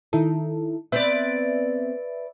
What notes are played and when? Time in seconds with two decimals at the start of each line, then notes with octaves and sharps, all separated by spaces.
0.13 D#3 D#4 E4 A4
0.92 B3 C4 B4 C5 D5 E5